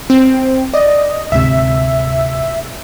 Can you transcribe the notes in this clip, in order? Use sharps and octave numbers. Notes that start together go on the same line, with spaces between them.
C4
D5 D#5
D2 G#2 C3 E5